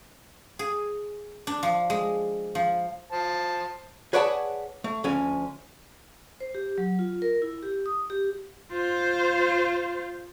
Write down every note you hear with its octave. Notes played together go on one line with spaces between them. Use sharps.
G#4
D4
F3
G#3
F3
C5 A5
G#4 B4 C#5 D5 F#5 A5
A3
D2 F3 C#4 G#5
C5
G4
F#3
F4
A#4
E4
G4
D#6
G4
F4 C5